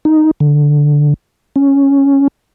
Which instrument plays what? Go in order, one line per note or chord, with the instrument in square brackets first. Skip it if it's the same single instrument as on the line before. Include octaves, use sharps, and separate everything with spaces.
[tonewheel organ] D#4
D3
C#4